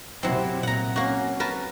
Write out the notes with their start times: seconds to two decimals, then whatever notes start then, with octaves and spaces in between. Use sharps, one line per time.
0.23 C3 F#3 C4 E4
0.63 A#2 F#5 A#5
0.96 A#3 C#4 F#4
1.40 A#4 B4 A5